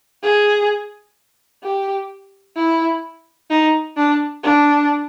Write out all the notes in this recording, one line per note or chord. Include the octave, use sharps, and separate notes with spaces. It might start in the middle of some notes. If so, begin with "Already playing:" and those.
G#4
G4
E4
D#4
D4
D4